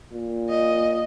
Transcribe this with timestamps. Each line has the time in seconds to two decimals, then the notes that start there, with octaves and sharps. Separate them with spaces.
0.13 A#2
0.49 D#5